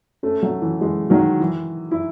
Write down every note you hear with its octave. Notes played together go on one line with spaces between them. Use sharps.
A3 C#4
F#3 A3
E3
E3 G#3
D#3 F#3
E3
E4